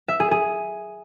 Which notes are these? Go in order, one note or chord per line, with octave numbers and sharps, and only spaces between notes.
E5
G#4
G#4